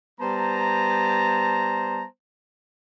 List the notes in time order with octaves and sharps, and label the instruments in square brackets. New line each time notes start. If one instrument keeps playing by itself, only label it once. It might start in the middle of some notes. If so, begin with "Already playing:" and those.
[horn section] G3 B3 C5 A5 A#5